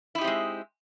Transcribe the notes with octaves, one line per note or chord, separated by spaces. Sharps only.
G#3 C4 D#4 E4 G4